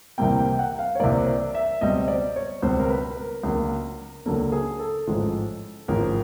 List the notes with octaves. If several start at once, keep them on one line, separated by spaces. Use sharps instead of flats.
C2 C3 E3 G3 A#3 G5
G5
F#5
F5
C#5
C2 C3 E3 G3 A#3 D5
D5
E5
C#2 B2 G3 C4 D#5
D5
C#5
C#2 B2 G3 C4 C5
A#4
B4
A#4
C#2 C#3 F#3 A#3 D4
C#2 C#3 F#3 A#3 D4 A4
G#4
A4
A1 G#2 F3 G#3
A1 G#2 F3 G#3 A#4